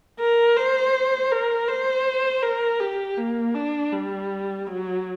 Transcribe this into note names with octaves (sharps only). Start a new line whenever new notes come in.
A#4
C5
A#4
C5
A#4
G4
A#3
D4
G3
F#3